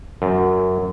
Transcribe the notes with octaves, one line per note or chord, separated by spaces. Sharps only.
F#2